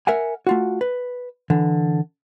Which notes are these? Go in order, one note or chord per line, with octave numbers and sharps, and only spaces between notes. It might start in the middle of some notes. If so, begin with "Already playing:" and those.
A#4 E5 F#5 G#5
A3 F4 F#4
B4
D3 E3